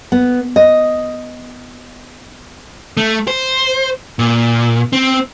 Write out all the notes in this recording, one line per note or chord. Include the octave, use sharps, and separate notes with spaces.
B3
D#5
A3
C5
A#2
C4